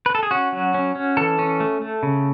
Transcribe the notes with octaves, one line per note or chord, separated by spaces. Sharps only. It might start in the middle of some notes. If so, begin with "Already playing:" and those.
B4
A4
G#4
C#4 F#4
F#3
C#4
C#4
E3 A4
C#4
A3
A3
C#3